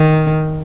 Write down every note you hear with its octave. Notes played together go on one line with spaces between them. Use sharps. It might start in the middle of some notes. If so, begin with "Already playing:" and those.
Already playing: D#3